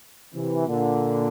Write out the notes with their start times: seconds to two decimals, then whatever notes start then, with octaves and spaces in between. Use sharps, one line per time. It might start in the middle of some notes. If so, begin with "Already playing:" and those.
0.34 C3 E3
0.68 A#2 D3